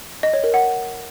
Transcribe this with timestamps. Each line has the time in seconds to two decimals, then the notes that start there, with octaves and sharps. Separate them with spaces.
0.23 D#5
0.33 C#5
0.44 A#4
0.54 F#5